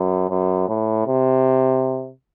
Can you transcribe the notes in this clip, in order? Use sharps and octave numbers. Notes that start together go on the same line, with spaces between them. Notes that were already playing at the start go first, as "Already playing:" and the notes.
Already playing: F#2
F#2
A2
C3